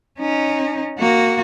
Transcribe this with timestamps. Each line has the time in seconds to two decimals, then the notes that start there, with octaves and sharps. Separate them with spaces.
0.19 C#4 D#4
0.99 A#3 F#4